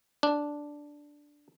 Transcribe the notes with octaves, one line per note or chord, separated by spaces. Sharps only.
D4